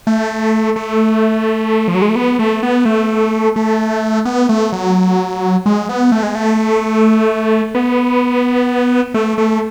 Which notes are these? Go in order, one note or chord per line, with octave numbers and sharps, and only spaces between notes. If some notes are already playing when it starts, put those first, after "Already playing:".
A3
A3
F3
F#3
G#3
A3
B3
A3
B3
A3
A3
B3
A3
F#3
G#3
B3
A3
G#3
A3
B3
A3
A3